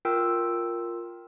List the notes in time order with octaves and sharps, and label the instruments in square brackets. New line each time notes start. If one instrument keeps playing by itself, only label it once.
[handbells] F4 A#4 G5 E6